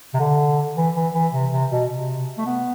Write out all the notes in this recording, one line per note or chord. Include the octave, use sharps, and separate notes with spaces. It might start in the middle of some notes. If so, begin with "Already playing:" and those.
C3
D3
E3
E3
E3
C3
C3
B2
C3
A3
B3